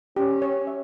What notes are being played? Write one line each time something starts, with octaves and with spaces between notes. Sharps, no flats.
C#4 G4
C#5
E5